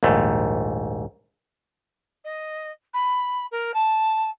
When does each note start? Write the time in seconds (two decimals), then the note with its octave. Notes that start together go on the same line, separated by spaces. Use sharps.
0.03 A#1 D#2 G#2 A3
2.25 D#5
2.94 B5
3.52 A#4
3.74 A5